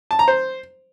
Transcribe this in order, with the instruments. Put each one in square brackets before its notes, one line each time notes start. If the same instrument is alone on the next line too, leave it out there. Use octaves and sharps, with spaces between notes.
[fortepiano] A5
A#5
C5